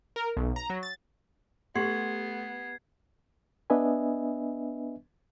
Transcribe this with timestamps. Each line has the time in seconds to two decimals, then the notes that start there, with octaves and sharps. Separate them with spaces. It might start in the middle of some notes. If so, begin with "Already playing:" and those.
0.16 A#4
0.37 B1
0.56 A#5
0.70 F#3
0.83 A6
1.75 A3 B3 G4 F#5 C6 G#6 C7
3.70 B3 D4 B4 D#5 E5 G#5